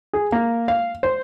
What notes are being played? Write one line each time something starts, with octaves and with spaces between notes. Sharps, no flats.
G#4
A#3
F5
C5